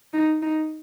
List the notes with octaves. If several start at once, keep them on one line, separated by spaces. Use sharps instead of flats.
D#4
D#4